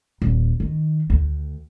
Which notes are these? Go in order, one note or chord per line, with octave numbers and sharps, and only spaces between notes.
D#1
D#3
D2